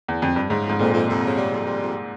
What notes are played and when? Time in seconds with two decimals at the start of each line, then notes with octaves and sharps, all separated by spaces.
0.08 E2
0.22 F2
0.36 G2
0.50 G#2 C#3
0.65 F2 G#2
0.79 F2 A#2
0.94 F2
1.08 F2 C3
1.23 C#3
1.38 G3
1.53 F2
1.67 G3
1.82 F2